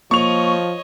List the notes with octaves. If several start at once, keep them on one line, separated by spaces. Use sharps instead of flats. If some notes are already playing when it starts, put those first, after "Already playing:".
F3 A#3 C#5 D#5 C#6 F7